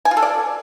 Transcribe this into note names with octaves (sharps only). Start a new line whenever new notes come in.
G#5
F4
A4
D5